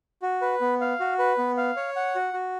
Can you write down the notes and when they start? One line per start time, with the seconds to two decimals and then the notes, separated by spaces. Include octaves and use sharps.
0.22 F#4
0.42 B4
0.61 B3
0.81 F5
1.00 F#4
1.19 B4
1.38 B3
1.57 F5
1.76 C#5
1.96 F#5
2.15 F#4
2.33 F#4